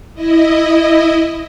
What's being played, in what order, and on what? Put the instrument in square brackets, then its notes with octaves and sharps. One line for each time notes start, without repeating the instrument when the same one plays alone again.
[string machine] E4 D#5